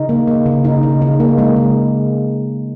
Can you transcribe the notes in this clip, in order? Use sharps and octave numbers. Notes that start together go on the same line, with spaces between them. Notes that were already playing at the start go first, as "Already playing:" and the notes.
Already playing: C#3 D#4
A#3
A#3
C#3
C#3 D#4
C#3
C#3 D#4
A#3
G#3 A#3
C#3